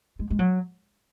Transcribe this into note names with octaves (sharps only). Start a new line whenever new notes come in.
G#3
G#3
F#3